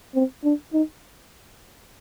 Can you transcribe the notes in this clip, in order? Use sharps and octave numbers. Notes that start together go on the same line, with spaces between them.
C4
D4
D#4